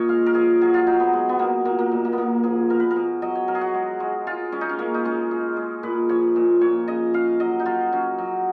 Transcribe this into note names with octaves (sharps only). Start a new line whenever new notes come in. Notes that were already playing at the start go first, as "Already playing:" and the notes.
Already playing: A#2 C#5 D#5
G#3 F5
A#4
F3 G#4
F#3 G#4
F4
F#3 D#4
B3
F#3 G#3
B3
B2 A#3
A#2 A#3
A#3
A#2
A#3
B3
A#2 A#3
F3 G#4
B2 A#4
B4
A#4
B2
F#3 D#5
C#5
F#3 A#4
G#4
F#4
G#3
G#3
G#3 F4
G#3 C#4
D#4
C#4
G#3 A#3
D#4
G#3 C#4
G#3
G#3
A#2 B4
F3 C#5
A#2
A#2 C#5
C#3 D#5
C#3 F5
F#3 D#5
D#4
F#3 F4
F#3 C#4
F#3